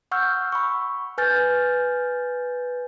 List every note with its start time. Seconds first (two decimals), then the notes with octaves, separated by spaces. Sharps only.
0.12 F#5 C#6 E6 F6 G6
0.52 B5 C#6
1.18 B4 G#5 F6 G6 A6